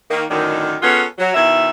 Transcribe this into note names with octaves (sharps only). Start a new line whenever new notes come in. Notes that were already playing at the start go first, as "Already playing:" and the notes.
D#3 A#3
F#2 A2 D3 D#3
B3 C#4 F4 G#4 A4 F#5
F#3
B2 D#3 E4 E5